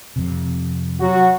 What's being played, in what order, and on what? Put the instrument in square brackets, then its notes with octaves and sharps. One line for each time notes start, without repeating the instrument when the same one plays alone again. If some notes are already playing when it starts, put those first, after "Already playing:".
[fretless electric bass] F2 C3
[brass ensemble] F#3 F#4